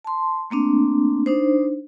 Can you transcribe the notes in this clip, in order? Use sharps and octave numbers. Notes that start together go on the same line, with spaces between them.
A5 C6
A3 A#3 C4 D4
D4 D#4 C5